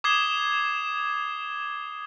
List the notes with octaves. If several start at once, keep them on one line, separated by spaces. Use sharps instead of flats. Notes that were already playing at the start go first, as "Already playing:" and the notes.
D6 D#6 G#6 C7 E7 G7